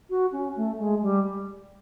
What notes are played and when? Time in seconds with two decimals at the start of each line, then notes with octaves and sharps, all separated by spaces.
0.10 F#4
0.32 C#4
0.56 A3
0.79 G#3
1.02 G3